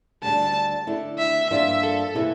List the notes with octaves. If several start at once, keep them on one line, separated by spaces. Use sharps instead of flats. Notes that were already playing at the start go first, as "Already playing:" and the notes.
D2 D3 G3 D4 A5
D3 A3 E4
E5
G2 F3 A#3 D4 F4 E5
A4
C3 E3 A#3 E4